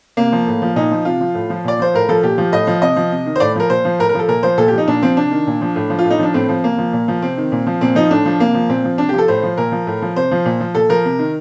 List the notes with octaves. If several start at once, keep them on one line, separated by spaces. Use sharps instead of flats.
C3 A#3
F3
A2
F3
A#2 D#4
F3
C3 F4
F3
A2
F3
A#2 D5
F3 C5
A2 A#4
F3 A4
A#2 G4
F3
A2 D#5
F3
C3 D#5
F3
C3
D#3
C5
A2 D5
F3 A#4
A#2 C5
F3
A2 A#4
A#4
F3 A4
A#2 A#4
F3 C5
A#2 A4
G4
F3 D#4
A#2 D4
F3 C4
C3 D4
D#3
A#2
F3
A2
F3
F4
A2
D#4
F3 D4
A2 C4
F3
C3 A#3
F3
A#2
F3
C3 C4
D#3
A#2
F3
A#2 C4
F3 D#4
A2 D4
F3
C3 A#3
F3
A#2 C4
F3
C3 D4
G4
F3
A4
A2 C5
F3
A#2 A#4
F3
A2
F3
C3 C5
F3
A#2
F3
A#2 A4
F3 A#4
C3
D#3